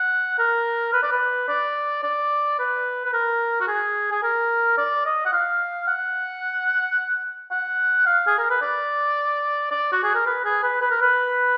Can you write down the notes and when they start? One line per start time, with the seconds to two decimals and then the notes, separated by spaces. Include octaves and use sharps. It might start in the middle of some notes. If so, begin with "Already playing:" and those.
Already playing: F#5
0.39 A#4
0.93 B4
1.03 D5
1.12 B4
1.48 D5
2.03 D5
2.59 B4
3.05 B4
3.13 A#4
3.61 F#4
3.68 G#4
4.11 G#4
4.23 A#4
4.77 D5
5.05 D#5
5.25 F#5
5.33 F5
5.87 F#5
7.51 F#5
8.06 F5
8.27 G#4
8.38 A#4
8.50 B4
8.62 D5
9.71 D5
9.92 F#4
10.03 G#4
10.15 A#4
10.26 B4
10.45 G#4
10.63 B4
10.81 B4
10.91 A#4
11.01 B4